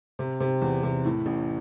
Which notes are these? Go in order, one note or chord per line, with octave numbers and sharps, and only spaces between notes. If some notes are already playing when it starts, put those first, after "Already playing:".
C3
C3
E2
C3
A2
A1